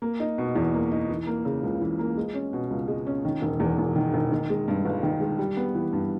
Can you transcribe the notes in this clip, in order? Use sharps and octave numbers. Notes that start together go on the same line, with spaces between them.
A#3
D#4
B2
E2
A#3
D#4
E3
A#3
C#3
C#2
E3
A#3
G#3
C#4
B2
C#2
G#3
C#4
D#3
E1
E2
E1
D#3
E1
D#3
G#3
G2
G1
D#3
G#3
G3
B3
E3
G2